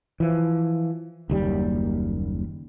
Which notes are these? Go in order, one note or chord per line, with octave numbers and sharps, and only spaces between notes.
E3 F3
F#1 D#2 G3